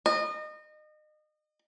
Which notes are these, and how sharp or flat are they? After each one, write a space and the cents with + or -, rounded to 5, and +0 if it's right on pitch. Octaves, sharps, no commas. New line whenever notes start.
D#5 -30